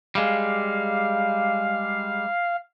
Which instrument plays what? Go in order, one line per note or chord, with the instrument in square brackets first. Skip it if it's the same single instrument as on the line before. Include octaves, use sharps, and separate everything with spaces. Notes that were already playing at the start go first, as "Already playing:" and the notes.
[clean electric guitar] G3 G#3 [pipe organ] F5